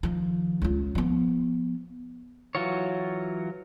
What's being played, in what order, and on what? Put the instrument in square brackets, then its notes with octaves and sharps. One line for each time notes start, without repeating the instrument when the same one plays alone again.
[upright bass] D#3 F3
C#2 F4
F3 B3
[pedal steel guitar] E3 F#3 F4 F#4 C#5